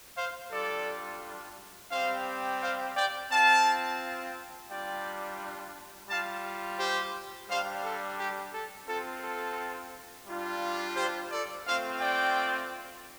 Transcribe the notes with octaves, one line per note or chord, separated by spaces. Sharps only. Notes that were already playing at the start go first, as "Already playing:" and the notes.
C5 F5
G3 D4 F4 A4 D5
G3 C4 G4 C5 F5
C5 F5
D5 G5
C4 F4 F5 A5
G3 D4 F4 D5 G5
G3 F4 F5 A5
G4 C5
G3 D4 G4 C5 F5
A4
G4
A4
C4 F4 A4
A4
G3 D4 F4
G4 C5
A4 D5
A3 C4 F4 C5 F5
D5 G5